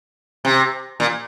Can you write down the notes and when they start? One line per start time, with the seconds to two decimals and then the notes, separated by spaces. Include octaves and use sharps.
0.45 C3
1.00 A#2